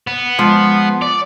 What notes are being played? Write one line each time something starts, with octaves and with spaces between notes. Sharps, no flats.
B3
F3 G#3
D5